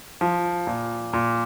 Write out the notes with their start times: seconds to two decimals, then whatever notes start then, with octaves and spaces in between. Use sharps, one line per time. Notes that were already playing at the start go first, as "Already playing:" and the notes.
0.21 F3
0.67 A#2
1.13 A#2